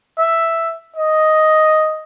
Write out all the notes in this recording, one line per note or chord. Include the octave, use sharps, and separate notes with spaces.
E5
D#5